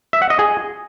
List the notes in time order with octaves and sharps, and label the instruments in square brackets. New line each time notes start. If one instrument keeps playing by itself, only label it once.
[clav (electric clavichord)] E5
F#5
D#5
G#4